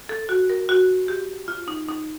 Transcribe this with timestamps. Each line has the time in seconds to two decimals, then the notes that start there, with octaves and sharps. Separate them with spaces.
0.09 A4
0.29 F#4
0.50 A#4
0.69 F#4
1.08 G4
1.48 F4
1.68 D#4
1.89 D#4